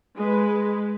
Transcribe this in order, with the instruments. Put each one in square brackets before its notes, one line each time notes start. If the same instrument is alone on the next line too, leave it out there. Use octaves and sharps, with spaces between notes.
[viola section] G#3 B4